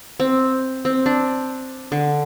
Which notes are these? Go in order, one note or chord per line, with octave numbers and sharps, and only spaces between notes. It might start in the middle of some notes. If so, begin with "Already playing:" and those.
C4
C4
D4
D3